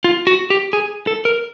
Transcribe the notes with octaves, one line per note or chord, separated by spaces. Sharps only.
F4
F#4
G4
G#4
A4
A#4